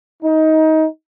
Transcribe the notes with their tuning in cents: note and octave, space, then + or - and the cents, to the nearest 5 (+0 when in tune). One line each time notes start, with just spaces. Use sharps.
D#4 +20